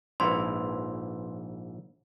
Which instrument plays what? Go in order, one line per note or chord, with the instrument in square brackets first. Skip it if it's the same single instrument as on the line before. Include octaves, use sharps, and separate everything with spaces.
[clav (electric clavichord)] A#1 G#2 E4 [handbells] B4 C6